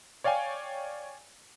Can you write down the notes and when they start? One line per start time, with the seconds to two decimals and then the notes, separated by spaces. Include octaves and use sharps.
0.24 C#5 D5 F5 G5 G#5